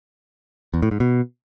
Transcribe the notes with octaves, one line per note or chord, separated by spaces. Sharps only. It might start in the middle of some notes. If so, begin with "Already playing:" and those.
E2
A2
G#2
B2